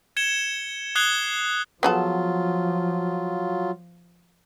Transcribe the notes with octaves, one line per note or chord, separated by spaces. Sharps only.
G#6 C#7 E7 G7
D#6 F#6 G#6 C7 G7
F3 F#3 B3 F4 G#4 A4